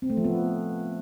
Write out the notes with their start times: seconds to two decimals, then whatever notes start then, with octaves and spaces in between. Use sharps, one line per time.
0.02 C4
0.10 A3
0.17 F3
0.24 B3